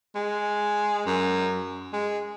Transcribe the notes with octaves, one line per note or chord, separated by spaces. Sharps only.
G#3
F#2
G#3